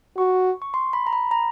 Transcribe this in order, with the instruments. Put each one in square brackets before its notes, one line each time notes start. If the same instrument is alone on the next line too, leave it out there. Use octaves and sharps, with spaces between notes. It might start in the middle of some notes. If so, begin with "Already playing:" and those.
[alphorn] F#4 [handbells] C#6
[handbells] C#6
C6
B5
A#5
B5
A#5